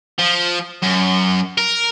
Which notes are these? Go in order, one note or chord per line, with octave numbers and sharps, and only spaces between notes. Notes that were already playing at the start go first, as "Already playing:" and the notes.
F3
F#2
A#4